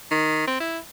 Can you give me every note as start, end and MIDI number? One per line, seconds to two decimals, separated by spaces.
0.11 0.45 51
0.47 0.60 60
0.60 0.78 64